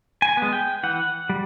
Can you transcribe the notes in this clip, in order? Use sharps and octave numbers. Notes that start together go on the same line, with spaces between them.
G#5
G#3 B3
G5
E3 F#5
G3